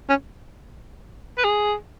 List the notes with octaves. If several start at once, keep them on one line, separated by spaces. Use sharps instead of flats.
C#4
B4
G#4